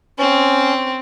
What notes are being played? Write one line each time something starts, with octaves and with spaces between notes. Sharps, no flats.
C4 C#4